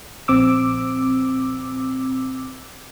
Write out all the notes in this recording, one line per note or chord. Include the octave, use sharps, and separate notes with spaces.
A#1 C4 D6 E6